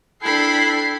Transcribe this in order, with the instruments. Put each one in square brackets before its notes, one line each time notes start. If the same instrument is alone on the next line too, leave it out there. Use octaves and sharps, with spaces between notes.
[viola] D4 A4 [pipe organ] E4 [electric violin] G5 B5 [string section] C7